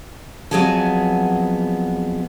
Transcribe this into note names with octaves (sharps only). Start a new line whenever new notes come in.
F2 F#3 B3 G#4 G#5 A5